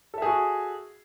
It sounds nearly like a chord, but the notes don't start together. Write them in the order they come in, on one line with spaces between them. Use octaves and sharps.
A4 E5 G#4 F#4